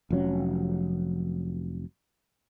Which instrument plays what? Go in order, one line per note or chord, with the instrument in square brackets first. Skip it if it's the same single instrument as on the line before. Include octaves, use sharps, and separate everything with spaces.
[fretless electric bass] F1 F3 F#3 C#4